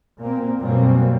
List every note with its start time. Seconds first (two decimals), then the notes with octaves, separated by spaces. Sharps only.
0.20 A#2 A#3 C4
0.60 F#2 B2 G3 A#3 C4